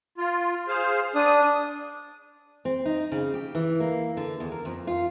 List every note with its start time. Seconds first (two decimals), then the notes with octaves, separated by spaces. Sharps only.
0.18 F4
0.68 G#4 C5 F5
1.15 D4 D#6
2.65 C4
2.85 D#4
3.12 C#3
3.34 G4
3.55 E3
3.80 A#3
4.17 D3
4.40 E2
4.52 A#4
4.65 F2
4.87 F4